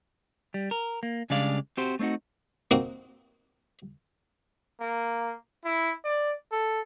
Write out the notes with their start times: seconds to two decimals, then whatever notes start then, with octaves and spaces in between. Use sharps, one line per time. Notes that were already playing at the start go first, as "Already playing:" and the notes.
0.54 G3
0.71 A#4
1.03 A#3
1.30 C#3 G3 G#3 D4 D5 F5
1.77 C4 F#4 G4 C5
1.99 A3 C4 D4 D#4 F#4
2.71 A#3 C4 D#4 F#4
4.80 A#3
5.65 E4
6.05 D5
6.52 A4